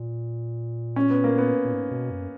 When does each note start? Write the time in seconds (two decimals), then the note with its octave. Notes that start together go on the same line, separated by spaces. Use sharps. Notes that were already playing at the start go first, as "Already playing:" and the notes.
Already playing: A#2
0.96 C#4
1.10 B3
1.24 A#3
1.38 B3
1.65 A#2
1.72 G#2
1.91 B2
2.10 F#2